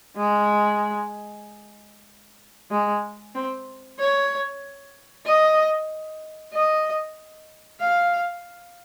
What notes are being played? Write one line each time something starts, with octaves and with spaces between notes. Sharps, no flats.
G#3
G#3
C4
C#5
D#5
D#5
F5